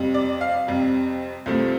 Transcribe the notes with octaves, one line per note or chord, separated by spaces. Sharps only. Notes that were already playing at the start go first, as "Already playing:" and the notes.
Already playing: F2 C3 G3
D5
F5
F2 C3 G3
C2 C3 F3 A3